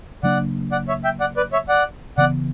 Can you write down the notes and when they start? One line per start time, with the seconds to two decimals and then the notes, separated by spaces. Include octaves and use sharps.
0.23 C#3 F#3 A#3 D4 D5 F#5
0.72 D5 F#5
0.88 C#5 E5
1.04 E5 G5
1.20 D5 F#5
1.37 B4 D5
1.53 C#5 E5
1.68 D5 F#5
2.17 C#3 E3 B3 D5 F#5